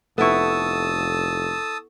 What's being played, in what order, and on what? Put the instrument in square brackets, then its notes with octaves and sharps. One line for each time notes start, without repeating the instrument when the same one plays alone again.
[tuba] F1 [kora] B3 E4 [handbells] A4 C#6 [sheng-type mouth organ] A5 D#6 E6